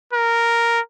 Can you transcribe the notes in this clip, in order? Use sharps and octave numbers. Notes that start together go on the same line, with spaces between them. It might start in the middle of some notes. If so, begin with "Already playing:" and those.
A#4